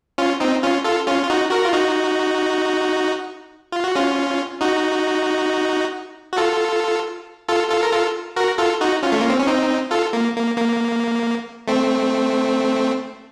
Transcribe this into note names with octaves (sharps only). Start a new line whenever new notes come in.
C#4 F4
C4 D#4
C#4 F4
F4 A4
C#4 F4
F4
D#4 F#4
F#4 A#4
F4
D#4 F#4
F4
F#4
C#4 F4
D#4 F#4
F#4
F4 A4
F4 A4
F4 A4
A#4
F4 A4
F#4 A#4
F4 A4
D#4 F#4
C#4 F4
A3
A#3
C4
C#4
C4 D#4
F4 A4
A#3
A#3
A#3
A3 C4